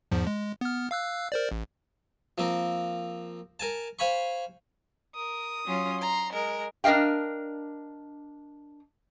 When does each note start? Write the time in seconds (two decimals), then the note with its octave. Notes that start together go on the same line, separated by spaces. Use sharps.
0.11 E2 G#2 F3
0.27 G#3
0.61 B3 F6
0.91 F5 E6 F#6
1.32 A#4 C5 D5
1.51 A1
2.38 F3 A#3 C4 A#4
3.60 A#4 G#5 A5
3.99 C5 F5 G#5 B5 C#6
5.15 A#4 D#6
5.65 F#3 C#4 F4
6.00 A#5 C6
6.32 G#3 A#4
6.84 D4 A#4 D#5 F5 G5